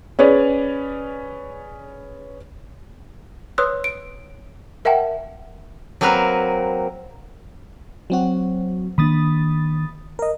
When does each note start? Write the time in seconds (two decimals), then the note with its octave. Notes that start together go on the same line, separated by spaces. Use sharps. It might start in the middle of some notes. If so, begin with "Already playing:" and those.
0.19 C#4 G#4 B4 C#5 D5
3.58 B4 C#5 C6 D#6 E6 F#6
3.84 D7
4.85 A#4 E5 F#5 G5 A5
6.01 F#3 A#3 C4 A#4 B4
8.10 F#3 C4 F#4
8.98 D#3 A#3 D4 B5 D#6 A6
10.19 A#4 D#5